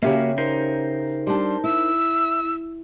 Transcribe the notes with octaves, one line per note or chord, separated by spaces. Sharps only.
C#3 A#3 C#4 F#4 G4 E5
D#4 A#4 C5
G3 D4 C6
E4 E6